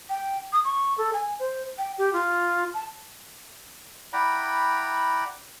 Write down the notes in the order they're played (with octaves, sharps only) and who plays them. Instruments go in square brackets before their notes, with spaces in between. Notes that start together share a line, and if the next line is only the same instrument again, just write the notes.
[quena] G5
D#6
C#6
A4
G#5
C5
G5
G4
F4
A5
[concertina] E4 D5 F#5 G5 A#5 B5